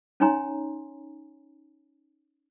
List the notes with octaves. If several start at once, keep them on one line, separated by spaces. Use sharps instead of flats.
C#4 D#4 C#5 G#5 A#5 C6